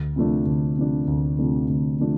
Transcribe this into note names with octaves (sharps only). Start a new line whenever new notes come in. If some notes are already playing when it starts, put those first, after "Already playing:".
Already playing: D2
C3 F3 A3 D4
D2
C3 F3 A3 D4
D2
C3 F3 A3 D4
D2
C3 F3 A3 D4